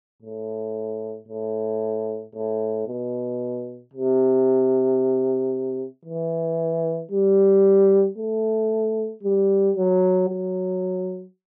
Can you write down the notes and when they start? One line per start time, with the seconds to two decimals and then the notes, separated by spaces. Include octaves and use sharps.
0.22 A2
1.28 A2
2.34 A2
2.87 B2
3.93 C3
6.05 E3
7.11 G3
8.18 A3
9.23 G3
9.76 F#3
10.29 F#3